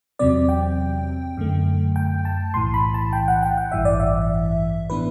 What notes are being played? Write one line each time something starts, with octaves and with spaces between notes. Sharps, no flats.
E2 C3 F#3 C4 D5
G5
F#2 D3 A3
G5
A5
B1 A2 E3 C6
B5
A5
G5
F#5
G5
F#5
A1 G2 E3 E5
D5
E5
A2 E3 B3 D4 B4